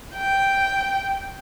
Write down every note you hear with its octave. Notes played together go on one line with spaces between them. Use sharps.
G5